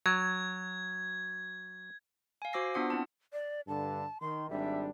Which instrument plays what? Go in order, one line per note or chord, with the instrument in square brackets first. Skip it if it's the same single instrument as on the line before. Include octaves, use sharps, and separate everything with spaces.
[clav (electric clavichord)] F#3 [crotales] G#6
[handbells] F5 G#5
F#4 C5 D6 E6 A#6 C7
B3 D4 F4 F#5 D#6
C4 E4 A5
[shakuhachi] D5
[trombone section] G2 D3 [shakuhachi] A5
[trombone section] D#3 [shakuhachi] C6
[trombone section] G#1 G3 D4 [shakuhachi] E5